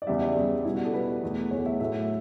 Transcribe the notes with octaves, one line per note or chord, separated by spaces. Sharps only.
D5
E2 C#3 G3 E5
D5
E2 C#3 G3
B2 G3 E4
F#4
A4
B2 G3 B4
E2 B2 A3
E2 B2 A3 C#5
E5
A2 F#3 A3 E5